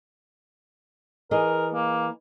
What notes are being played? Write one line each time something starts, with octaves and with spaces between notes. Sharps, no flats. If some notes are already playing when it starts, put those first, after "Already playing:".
E3 G#4 A#4 D#5
A#3